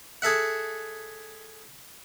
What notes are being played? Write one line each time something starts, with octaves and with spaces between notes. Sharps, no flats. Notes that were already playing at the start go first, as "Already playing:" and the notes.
G#4 A4 E5 F#5